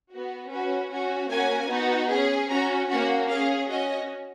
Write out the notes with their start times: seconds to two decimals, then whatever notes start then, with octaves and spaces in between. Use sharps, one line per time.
0.11 B3 F#4
0.50 C#4 F#4 B4
0.90 C#4 F#4
1.30 A#3 C#4 F#4 G#5
1.70 B3 D#4 F#4
2.10 C#4 G#4
2.49 C#4 F#4 A#5
2.89 A#3 C#4 F#4 F#5
3.29 C#4 G#4 F5
3.69 C#4 F#4 D#5